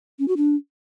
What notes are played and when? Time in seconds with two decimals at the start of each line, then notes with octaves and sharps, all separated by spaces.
0.19 C#4
0.28 F#4
0.37 D4